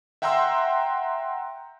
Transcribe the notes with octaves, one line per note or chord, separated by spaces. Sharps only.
E5 F#5 G5 A#5 C6 E6